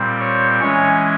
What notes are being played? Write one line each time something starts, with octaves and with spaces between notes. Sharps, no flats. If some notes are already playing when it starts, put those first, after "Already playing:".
Already playing: A#2 G3 C4
C#5
E3 G#3 C#4 C#5